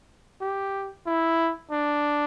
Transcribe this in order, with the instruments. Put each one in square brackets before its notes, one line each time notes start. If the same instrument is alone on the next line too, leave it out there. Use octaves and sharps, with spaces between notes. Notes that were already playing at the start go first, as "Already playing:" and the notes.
[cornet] G4
E4
D4